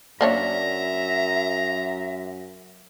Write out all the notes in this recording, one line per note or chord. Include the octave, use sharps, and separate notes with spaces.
F#2 A#3 D4 C#5 E5 A#5